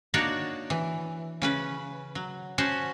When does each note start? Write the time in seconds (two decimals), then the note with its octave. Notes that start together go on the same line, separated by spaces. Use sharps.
0.14 A#3 D4 D#4 F#4 C#5 D5
0.70 E3
1.42 C#3 C#4 B4
2.15 F#3
2.58 C#4 F#4 C5 A5